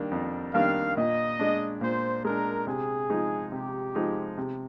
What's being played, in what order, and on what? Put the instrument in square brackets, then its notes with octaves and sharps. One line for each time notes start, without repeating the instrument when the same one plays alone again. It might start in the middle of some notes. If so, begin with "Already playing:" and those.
Already playing: [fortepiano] D#3 G3 A#3 D4
F2
[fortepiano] D#3 G3 A#3 D4 [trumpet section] F5
[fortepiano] A#2 [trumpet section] D#5
[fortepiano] G#3 D4
[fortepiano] A#2 [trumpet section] C5
[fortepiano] G#3 D4 [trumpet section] A#4
[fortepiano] C3 [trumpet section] G#4
[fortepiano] F3 G#3 D#4
[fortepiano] C3 [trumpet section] G4
[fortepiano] F3 G#3 D#4
C3